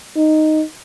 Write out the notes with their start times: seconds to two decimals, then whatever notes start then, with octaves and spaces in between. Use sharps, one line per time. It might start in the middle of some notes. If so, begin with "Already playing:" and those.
0.16 D#4